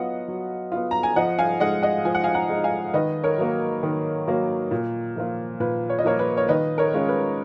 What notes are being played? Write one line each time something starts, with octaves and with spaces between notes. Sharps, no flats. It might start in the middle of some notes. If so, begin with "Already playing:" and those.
Already playing: F#3 B3 F4 D#5 F#5
F#3
B3 F4
A#5
G#5
F3 D#5 F#5
F5 G#5
G#3 D#4 D#5 F#5
D#5 F#5
F3 G#5
F#5
F5 G#5
F#5 A#5
G#3 D#4
F5 G#5
D#3 B4 D#5
A#4 C#5
F#3 A#3
D#3
F#3 A#3
A#2
F3 A#3 F4
A#2 B4
C#5
D#5
F3 A#3 F4 A#4 C#5
B4
C#5
D#3 B4 D#5
A#4 C#5
G#3 C#4 F4
B4